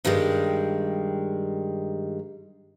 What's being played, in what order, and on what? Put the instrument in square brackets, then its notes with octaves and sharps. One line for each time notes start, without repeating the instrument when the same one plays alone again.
[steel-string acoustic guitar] G2 D#3 G3 G#3